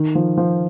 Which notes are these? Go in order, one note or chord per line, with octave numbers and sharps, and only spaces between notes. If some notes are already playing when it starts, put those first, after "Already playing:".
Already playing: D#3
F3
F3